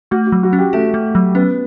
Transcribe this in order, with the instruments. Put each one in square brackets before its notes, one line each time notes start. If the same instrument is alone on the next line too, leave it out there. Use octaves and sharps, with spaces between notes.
[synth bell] A3 [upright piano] F#4
[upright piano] F#4
[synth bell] F#3
[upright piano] F#4
[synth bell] C#4
[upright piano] G4
[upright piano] A3 [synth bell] F#4
[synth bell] A3
F#3
[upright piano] B3 [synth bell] C#4